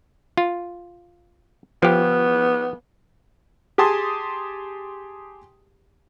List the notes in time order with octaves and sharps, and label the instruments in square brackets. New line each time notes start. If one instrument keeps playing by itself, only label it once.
[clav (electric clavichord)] F4
[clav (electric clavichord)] F3 G4 [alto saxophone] B3
[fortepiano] G4 G#4 G#5 A5 C6 D#6